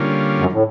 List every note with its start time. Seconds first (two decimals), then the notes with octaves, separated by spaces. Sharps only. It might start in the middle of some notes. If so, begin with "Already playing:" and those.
Already playing: D3 G3 A#3 C#4 F4
0.39 F#2
0.52 A2